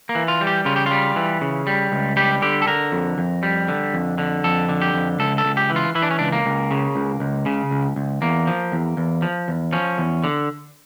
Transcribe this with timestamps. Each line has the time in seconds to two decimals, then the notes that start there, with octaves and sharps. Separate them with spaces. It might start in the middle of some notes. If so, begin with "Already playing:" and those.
0.09 A#3
0.15 E3
0.28 F4
0.41 G3
0.47 G4
0.65 C#3 F4
0.76 G4
0.86 G3 F4
1.16 E3
1.41 C#3
1.67 G3
1.92 C#2
2.16 G3 G4
2.42 D3 G4
2.62 A4
2.67 D3 A#4
2.92 F2
3.18 F2
3.43 G3
3.68 D3
3.94 F2
4.18 D3
4.44 F2 A4
4.69 D3
4.82 G4
4.94 F2
5.19 C#2 A4
5.38 A4
5.45 C#2
5.57 G4
5.70 E3
5.76 F4
5.95 E3 E4
6.02 D4
6.11 C#4
6.19 C#2 D4
6.32 A#3
6.46 C#2
6.71 C#3
6.96 C#2
7.20 C#2
7.46 C#3
7.71 C#2
7.96 C#2
8.22 E2 A#3
8.47 F3
8.72 E2
8.97 E2
9.22 F3
9.48 E2
9.73 F3 C#4
9.98 E2
10.24 D3